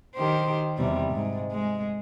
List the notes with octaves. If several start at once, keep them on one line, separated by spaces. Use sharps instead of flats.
D#3 G4 C5
E2 C3 G3
G#2
G#3